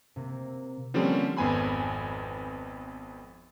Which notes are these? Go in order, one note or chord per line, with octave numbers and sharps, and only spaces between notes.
C3 A#3
D3 F3 G3 A#3 C4 C#4
G#1 F2 B3 G#5 B5 C6